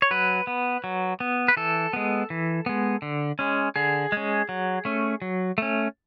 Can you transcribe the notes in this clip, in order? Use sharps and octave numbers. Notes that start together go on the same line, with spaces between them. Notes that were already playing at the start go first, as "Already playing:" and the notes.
C#5
F#3 B4
B3
F#3
B3
B4
E3 A4
G#3 B3
E3
G#3 B3
D3
G#3 C#4
D3 G#4
G#3 C#4
F#3
A3 C#4
F#3
A3 C#4